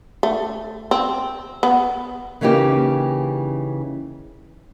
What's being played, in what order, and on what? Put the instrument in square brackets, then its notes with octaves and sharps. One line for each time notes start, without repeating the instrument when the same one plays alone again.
[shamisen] A3
C4
B3
[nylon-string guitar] C#3 E3 A#3 C#4 D#4 G4